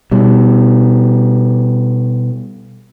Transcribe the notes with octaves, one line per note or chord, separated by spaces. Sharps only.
B2 G3